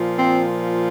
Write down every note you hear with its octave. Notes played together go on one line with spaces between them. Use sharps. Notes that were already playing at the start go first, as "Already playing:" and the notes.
Already playing: A#2 F3
C4